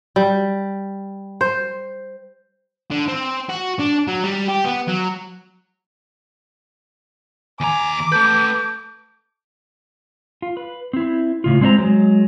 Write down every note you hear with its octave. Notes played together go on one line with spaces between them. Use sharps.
G3
C5
D3
C4
F#4
D4
F#3
G3
G4
B3
F#3
D#2 G#5 A#5 D6
A3 A4 B4 G6
F4
B4
C4 E4
A2 C#3 F4
G#3 C4 D4 C5 A#5
F#3 G#3